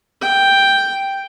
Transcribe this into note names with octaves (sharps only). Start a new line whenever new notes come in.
G5